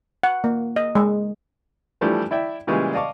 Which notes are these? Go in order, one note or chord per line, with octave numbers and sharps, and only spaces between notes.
F#5
A#3
D#5
G#3
E3 F3 G3 A3 D4 E4
E4 D5 E5 G5
A#2 C#3 E3 G3 G#3
D5 D#5 F5 A5 C#6 D6